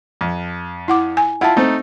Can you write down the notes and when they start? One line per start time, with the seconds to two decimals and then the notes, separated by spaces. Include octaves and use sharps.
0.21 F2
0.88 E4 F#5 D6
1.17 G#5
1.41 E4 F4 F#5 A5
1.56 A3 C4 D#4 C5